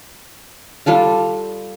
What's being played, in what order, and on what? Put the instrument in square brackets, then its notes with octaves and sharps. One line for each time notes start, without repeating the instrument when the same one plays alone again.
[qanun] G3 F4 A4 F5